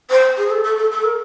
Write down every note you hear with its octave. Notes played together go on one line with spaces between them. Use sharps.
C5
G#4
A4
A4
A4
A4
A#4